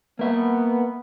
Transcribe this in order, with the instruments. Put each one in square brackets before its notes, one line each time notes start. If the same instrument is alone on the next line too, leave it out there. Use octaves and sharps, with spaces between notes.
[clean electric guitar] A#3 E5 [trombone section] B3